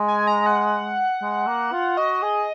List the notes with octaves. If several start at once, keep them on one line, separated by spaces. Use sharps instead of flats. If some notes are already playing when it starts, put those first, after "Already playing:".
Already playing: G#3
G#5
A#5
F#5
G#3
A#3
F4
F#4 D#5
G#4